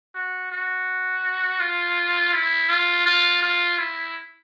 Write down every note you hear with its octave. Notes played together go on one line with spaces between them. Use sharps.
F#4
F#4
F4
E4
F4
F4
F4
E4